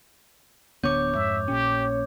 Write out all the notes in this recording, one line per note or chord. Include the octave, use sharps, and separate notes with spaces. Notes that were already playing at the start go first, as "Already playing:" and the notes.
D1 D3 B3 C#5 D6 G6
F2 G#2 E5
A#1 A#2 C#4 G4